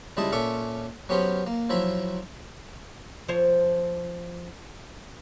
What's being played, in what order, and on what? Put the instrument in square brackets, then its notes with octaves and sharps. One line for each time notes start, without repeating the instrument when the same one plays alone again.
[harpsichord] C#2 G3 E4 D#5 A5
A#2 C#4 A4 E5 C#6 D6
F#3 B3 C#4 G4 C5
A#3
F3 F#3 E4 E5
[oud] F3 C5 C#5